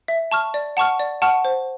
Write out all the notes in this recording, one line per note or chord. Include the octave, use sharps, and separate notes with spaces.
E5
A5 C#6 F6
D5
F#5 A5 C#6 F6
D5
F#5 A5 C#6 F6
C5